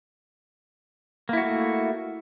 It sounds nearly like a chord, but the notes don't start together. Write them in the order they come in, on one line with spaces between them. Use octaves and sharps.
A#3 E4 F#4 A3